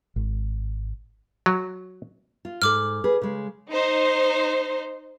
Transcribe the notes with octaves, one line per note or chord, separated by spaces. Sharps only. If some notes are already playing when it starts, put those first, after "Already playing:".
G#1
F#3
F4
G#2 A4 D6 F6
G#4 B4
C#3 G#3
D#4 C5